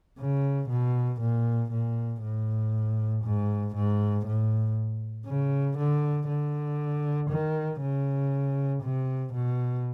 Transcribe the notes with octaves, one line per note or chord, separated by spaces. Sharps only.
C#3
B2
A#2
A#2
A2
G#2
G#2
A2
C#3
D3
D3
D#3
C#3
C3
B2